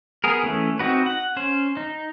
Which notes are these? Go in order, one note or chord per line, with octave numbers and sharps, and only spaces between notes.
B3 G#4 A#4
E3 A3 C#4
C4 D#4 F#4 B4
F#5
C#4 C5
D#4